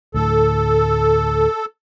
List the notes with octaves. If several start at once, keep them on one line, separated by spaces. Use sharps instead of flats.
D2 A2 A4